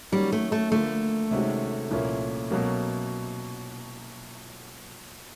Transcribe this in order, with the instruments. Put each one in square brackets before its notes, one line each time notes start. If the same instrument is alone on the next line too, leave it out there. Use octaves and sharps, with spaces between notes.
[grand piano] D#3 F#3 A#3 C#4 [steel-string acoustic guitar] G3
[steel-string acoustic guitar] A3
A3
[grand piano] D3 F3 A#3 [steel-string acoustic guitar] A3
[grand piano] C3 D#3 G#3 C#4 F#4
C2 A#2 F3 A#3 C#4
B2 F#3 A#3 C#4